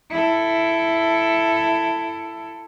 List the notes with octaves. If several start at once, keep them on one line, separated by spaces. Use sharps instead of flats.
E4 A4